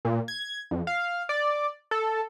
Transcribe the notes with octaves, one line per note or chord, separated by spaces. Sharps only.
A#2
G#6
F2
F5
D5
A4